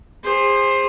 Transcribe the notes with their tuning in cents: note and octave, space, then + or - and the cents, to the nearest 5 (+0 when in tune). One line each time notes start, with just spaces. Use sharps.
G#4 -30 C5 +15